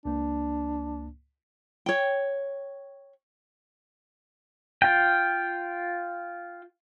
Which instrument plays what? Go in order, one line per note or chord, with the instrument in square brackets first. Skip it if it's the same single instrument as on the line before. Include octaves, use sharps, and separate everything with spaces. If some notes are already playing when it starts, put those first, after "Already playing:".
[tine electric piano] C#2 A#3 [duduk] D4
[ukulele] C#5 G5
[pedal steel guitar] F4 G5